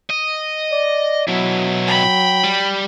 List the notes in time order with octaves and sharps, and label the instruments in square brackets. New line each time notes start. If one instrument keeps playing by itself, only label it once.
[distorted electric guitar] D#5
[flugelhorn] D5
[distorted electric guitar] B2 E4 [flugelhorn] F#3
[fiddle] G5 B5
[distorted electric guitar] G3